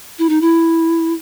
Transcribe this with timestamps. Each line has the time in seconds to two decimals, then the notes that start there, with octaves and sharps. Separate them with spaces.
0.19 E4
0.29 D#4
0.41 E4